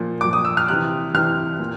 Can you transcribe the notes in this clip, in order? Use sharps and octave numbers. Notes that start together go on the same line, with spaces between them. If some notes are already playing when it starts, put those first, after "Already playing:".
Already playing: A#2 F3
A#2 F3 D6
D#6
E6
F6
C3 E3 F#6
C3 E3 F6
A#2